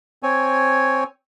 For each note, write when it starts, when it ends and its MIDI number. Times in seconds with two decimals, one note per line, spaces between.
0.23 1.04 60
0.23 1.04 73
0.23 1.04 80